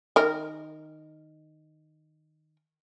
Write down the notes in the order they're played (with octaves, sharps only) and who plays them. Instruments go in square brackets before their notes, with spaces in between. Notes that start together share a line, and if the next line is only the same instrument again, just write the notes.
[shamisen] D#3 A#4